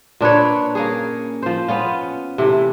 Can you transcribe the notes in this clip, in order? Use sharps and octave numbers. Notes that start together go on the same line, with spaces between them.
A#2 D4 B4 C#5
A#3 C#4 G#4
F3 C5
B3 C#4 F4
C3 E3 A3